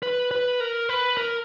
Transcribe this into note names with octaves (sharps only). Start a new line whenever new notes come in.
B4
B4
A#4
B4
A#4